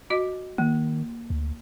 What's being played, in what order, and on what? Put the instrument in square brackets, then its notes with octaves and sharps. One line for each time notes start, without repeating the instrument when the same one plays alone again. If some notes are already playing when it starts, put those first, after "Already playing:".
[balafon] F#4 D#5
[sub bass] D#3 [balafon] A#3
[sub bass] D2